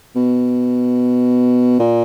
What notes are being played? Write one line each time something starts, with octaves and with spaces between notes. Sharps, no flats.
B2
A#2